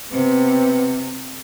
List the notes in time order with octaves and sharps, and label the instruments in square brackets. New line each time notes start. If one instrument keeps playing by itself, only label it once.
[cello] C3 [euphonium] B3 [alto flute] C4